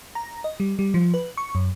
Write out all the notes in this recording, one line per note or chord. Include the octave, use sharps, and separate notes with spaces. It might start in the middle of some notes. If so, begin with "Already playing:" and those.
A#5
D#5
G3
G3
F3
B4
C#6
F#2